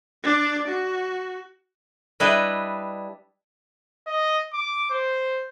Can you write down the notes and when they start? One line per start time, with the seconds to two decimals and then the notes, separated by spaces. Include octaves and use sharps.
0.24 D4 D5
0.68 F#4
2.20 G3 D4 E4 B4 D#5 E5
4.07 D#5
4.53 D6
4.91 C5